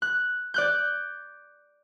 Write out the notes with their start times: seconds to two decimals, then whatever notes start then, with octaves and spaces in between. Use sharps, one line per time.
0.02 F#6
0.54 D5 F#6 G6